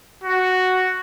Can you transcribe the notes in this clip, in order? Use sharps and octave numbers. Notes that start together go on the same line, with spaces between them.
F#4